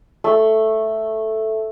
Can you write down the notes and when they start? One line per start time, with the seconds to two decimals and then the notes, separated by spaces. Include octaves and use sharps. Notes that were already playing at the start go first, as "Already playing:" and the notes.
0.24 A3